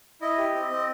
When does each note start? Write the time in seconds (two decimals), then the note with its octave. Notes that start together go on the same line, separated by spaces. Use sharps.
0.21 E4 D#5
0.38 G4
0.54 C4
0.71 C4